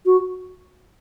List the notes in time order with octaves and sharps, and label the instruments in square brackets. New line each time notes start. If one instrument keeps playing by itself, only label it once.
[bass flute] F#4